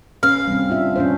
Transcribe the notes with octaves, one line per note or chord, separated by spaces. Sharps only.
C#4 B4 F5
G3 C4
D4 F4 E5
C#4 D4 C5